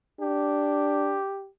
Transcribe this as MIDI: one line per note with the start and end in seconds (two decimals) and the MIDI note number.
0.21 1.20 62
0.21 1.49 67